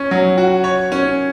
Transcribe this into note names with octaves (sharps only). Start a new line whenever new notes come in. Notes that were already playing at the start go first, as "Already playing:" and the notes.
Already playing: C#4
F#3
F#4
C#5
C#4